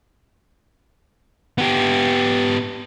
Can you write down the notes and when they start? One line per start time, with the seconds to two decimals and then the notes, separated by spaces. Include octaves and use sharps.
1.58 B3 G4